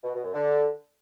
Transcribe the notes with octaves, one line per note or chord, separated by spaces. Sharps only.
B2
B2
F#2
D3